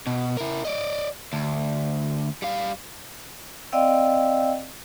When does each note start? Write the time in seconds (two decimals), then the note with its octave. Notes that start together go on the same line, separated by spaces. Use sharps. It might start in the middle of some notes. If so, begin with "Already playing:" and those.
0.07 B2
0.37 E4 A#4
0.65 D5 D#5
1.33 D2
2.42 G3 F5
3.72 C4 D5 D#5 F5 G5 E6